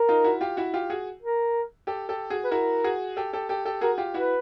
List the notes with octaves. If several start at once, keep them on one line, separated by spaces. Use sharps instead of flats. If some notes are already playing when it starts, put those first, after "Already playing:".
Already playing: A#4
D#4 F4
E4 F#4
F4 G4
E4 F#4
F4 G4
F#4 G#4
A#4
G4 A4
G4 A4
F#4 G#4
B4
E4 F#4 A#4
F#4 G#4
G4 A4
G4 A4
G4 A4
G4 A4
F#4 G#4 A#4
F4 G4
E4 F#4 B4